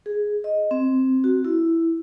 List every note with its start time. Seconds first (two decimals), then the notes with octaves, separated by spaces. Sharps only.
0.06 G#4
0.44 D#5
0.71 C4
1.24 F#4
1.45 E4